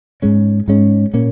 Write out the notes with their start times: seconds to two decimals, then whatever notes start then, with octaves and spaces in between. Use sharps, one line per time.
0.22 G#2 G#3 C#4
0.68 G#2 G#3 C#4
1.14 A#2 A#3 C#4